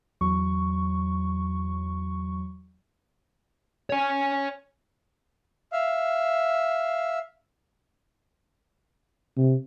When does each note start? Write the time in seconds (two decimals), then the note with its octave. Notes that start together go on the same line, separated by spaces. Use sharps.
0.21 E2 F#3 C#6
3.90 C#5 G#5
5.72 E5 F5
9.37 C3